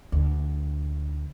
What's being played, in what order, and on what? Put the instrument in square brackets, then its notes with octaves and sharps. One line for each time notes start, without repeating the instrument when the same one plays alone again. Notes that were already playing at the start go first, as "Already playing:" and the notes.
[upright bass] D2